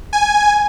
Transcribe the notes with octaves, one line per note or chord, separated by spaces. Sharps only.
G#5